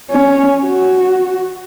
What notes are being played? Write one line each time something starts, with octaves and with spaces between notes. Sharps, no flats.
C#4
F#4